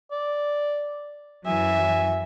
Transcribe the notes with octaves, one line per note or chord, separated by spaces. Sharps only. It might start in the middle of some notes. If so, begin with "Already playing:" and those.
D5
F#2 E3 F#3 E5 G#5